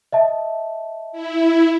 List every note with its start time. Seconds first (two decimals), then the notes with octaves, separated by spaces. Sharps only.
0.12 D#5 E5 A5
1.12 E4